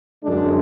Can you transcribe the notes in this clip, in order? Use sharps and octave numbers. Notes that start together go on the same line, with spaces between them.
F#2 D3 G#3 D4